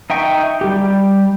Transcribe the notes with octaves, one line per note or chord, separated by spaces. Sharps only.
D#4 E5 G5 C#6
G3 G4